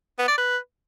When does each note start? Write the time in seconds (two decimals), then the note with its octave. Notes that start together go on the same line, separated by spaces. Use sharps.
0.18 B3
0.28 D5
0.38 B4